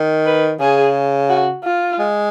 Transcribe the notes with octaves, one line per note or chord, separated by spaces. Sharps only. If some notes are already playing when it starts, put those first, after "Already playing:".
Already playing: D#3
B4
C#3 G#4
F#4
F4
G#3